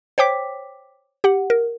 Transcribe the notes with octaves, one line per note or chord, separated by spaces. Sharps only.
C5 C#5 G5 D6 B6
G4 F#5
A#4